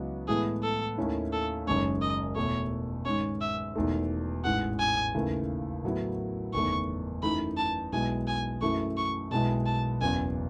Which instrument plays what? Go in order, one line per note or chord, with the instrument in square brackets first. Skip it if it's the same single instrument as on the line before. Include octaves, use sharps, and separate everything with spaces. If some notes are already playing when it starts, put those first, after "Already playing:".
Already playing: [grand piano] C#2 C#3 F#3 B3 E4
[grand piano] A2 E3 G#3 B3 E4 [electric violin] G#4
[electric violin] A4
[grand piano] D#2 D#3 A3 C#4 E4
[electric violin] A4
[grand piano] F#1 F#2 D#3 G#3 C#4 [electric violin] C#5
[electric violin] D#5
[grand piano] E2 B2 A3 [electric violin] C#5
[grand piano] G#2 D#3 G#3 C#4 [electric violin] C#5
[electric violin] E5
[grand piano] E1 E2 D#3 A3 D#4
[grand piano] A1 G#2 E3 G#3 [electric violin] F#5
[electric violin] G#5
[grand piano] D#2 C#3 E3 A3
A2 F#3 B3 E4
[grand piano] F#1 E2 D#3 A3 [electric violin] C#6
[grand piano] F#2 E3 A3 D#4 [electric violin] B5
[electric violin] A5
[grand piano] B1 B2 G#3 B3 E4 [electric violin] G#5
[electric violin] G#5
[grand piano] F#2 E3 A3 E4 [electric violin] C#6
[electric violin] C#6
[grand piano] B1 B2 G#3 B3 E4 [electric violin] A5
[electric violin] A5
[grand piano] F#1 E2 C#3 [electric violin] G#5